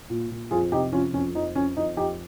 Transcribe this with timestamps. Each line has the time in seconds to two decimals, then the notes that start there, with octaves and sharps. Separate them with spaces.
0.10 A#2
0.30 A#2
0.51 F2 F4 G#4
0.72 C3 D#4 G4
0.92 F3 C#4 F4
1.14 F2 C#4
1.35 F2 D#4
1.55 F2 C#4
1.77 F2 D#4
1.97 F2 D#4 G4